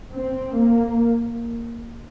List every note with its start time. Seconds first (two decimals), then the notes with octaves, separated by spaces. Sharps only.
0.14 C4
0.56 A#3